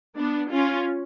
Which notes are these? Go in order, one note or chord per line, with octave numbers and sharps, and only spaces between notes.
B3 D4
C#4 F4